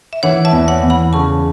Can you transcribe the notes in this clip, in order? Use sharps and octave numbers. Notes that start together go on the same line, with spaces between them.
E5
E3 C#5 F#5
E5 A5
E2
C#5 F#5
E2
F#5 B5
C#3 A5 C#6